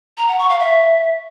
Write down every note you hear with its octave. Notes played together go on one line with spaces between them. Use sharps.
A#5
F#5
C#6
F5
E5